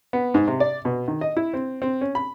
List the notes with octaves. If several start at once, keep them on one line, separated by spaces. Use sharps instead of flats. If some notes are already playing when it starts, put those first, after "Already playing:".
B3
G#2
C3
D5
B2
D#3
D#5
E4
C4
C4
C#4
B5